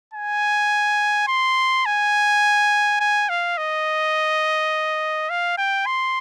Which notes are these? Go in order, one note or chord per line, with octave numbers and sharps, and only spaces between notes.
G#5
C6
G#5
G#5
F5
D#5
F5
G5
C6